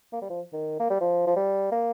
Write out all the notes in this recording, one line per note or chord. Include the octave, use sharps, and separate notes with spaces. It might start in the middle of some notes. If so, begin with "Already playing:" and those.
A#3
G3
F3
D#3
A#3
G3
F3
F3
G3
A#3